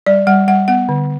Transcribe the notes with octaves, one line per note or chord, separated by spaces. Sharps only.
G3 D5
G3 F#5
G3 F#5
B3 F#5
D3